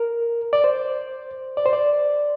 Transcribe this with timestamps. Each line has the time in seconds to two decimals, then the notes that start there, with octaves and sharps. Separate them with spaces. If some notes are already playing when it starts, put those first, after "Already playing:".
Already playing: A#4
0.53 D5
0.64 C5
1.57 D5
1.66 C5
1.73 D5